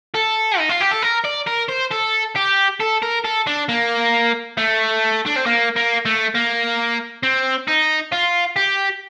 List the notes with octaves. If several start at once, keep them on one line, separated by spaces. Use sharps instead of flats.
A4
D#4
F4
G4
A4
A#4
D5
A#4
C5
A4
G4
A4
A#4
A4
D4
A#3
A3
D4
C4
A#3
A#3
A3
A#3
C4
D#4
F4
G4